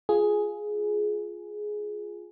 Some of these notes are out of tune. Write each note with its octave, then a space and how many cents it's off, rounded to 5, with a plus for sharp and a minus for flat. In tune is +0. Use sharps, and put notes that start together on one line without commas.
F4 +0 G#4 +10